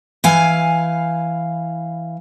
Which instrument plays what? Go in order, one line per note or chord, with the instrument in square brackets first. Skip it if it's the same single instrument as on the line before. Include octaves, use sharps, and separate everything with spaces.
[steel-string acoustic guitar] E3 F5 G#5